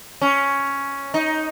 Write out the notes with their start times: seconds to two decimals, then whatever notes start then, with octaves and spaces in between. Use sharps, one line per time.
0.21 C#4
1.14 D#4